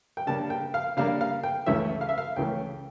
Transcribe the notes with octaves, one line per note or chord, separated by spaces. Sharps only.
G5
C#3 G3 A#3 D4 A5
G5
F5
C#3 G3 A#3 D4 F5
F5
G5
C#2 C#3 E3 A3 C#4 E5
F5
E5
F5
C#2 C#3 E3 A3 C#4 G5